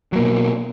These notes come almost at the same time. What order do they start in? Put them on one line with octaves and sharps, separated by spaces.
F#3 A#3 B2